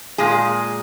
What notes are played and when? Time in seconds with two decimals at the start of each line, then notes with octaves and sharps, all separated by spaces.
0.18 A#2 G#3 G#4